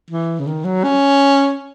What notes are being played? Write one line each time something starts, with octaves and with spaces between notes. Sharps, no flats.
E3
C#3
D#3
F#3
C#4